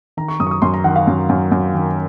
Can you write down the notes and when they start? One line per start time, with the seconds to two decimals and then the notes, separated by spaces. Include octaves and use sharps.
0.17 D#3 A#5
0.28 C#6
0.40 F#2 D#6
0.47 C#6
0.51 D#6
0.62 F#2 C6
0.74 A#5
0.84 D#3 F#5
0.96 F5
1.07 F#2
1.29 F#2
1.52 F#2
1.74 D#3